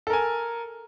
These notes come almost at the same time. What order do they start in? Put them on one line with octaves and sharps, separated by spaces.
A4 A#4 G#5